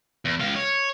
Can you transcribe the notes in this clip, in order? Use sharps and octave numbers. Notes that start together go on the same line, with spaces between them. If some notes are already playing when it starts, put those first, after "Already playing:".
E2
C#2 F5
C#5